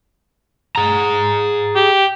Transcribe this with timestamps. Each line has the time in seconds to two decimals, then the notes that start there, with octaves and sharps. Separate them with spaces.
0.76 G#4 A#5
1.76 G4